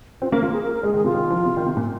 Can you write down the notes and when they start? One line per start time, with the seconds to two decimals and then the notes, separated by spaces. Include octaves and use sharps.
0.21 C4 F4
0.32 A#3 A#4
0.42 A#3 F4
0.53 G#4
0.63 A#4
0.74 A#4
0.83 G#3 G#4
0.94 D#3 G#4
1.04 C3 F4
1.14 D#3
1.30 F3
1.46 C3
1.57 D#3
1.66 C3
1.77 A#2